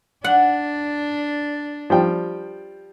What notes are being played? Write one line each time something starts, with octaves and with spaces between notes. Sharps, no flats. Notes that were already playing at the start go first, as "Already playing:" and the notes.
D4 F#5
F3 G3 G5